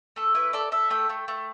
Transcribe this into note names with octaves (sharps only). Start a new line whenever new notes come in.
A3 A4
E4 B4
A4 D5
A4 E5
A3 G5
A3
A3